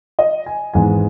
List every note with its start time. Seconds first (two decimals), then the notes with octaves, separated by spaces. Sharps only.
0.19 D#5
0.46 G#5
0.74 G#1 G#2 E3 G#3 B3 G#5